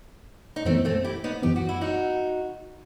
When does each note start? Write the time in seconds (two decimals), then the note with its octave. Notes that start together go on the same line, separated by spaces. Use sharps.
0.56 D#4
0.65 F#2 E3 A3 B3 C4
0.85 A3 C4
1.04 E4 G4
1.24 B3 D#4
1.43 F#2 E3 B3 G4
1.56 F#4
1.69 E4
1.81 D#4 F#4